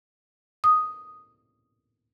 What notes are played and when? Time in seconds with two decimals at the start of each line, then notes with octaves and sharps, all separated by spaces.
0.64 D#6